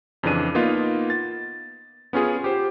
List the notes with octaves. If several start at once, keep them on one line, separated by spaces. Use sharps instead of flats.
F2 C#3 E3 D4 D#7
A#3 B3 D#4 F4
A6
B3 C#4 F4 G#4
G4 C5